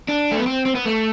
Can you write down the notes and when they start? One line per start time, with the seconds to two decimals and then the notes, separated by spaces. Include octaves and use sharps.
0.08 D4
0.32 A3
0.39 B3
0.46 C4
0.66 C4
0.75 B3
0.85 A3